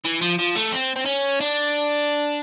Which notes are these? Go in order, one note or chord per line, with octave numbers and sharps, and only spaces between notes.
E3
F3
F3
A3
C4
C4
C#4
D4